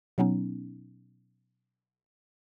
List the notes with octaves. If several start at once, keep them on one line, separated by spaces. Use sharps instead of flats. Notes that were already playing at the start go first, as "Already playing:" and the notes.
B2 F#3 B3 C#4 D#4